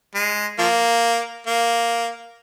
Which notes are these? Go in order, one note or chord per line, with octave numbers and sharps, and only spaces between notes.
G#3
F3 A#3
A#3